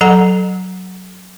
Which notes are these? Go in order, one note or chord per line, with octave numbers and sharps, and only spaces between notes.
F#3 A4 F#5 A#5